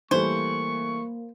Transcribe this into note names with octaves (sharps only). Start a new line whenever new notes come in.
E3 G3 A3 A#3 C5 C#6